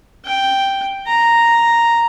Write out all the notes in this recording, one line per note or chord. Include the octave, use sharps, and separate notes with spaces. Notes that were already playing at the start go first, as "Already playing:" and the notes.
G5
A#5